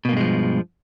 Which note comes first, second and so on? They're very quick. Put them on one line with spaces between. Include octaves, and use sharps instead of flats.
B2 A#3 G2 G#3 F3